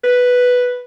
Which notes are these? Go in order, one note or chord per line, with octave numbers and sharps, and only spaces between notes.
B4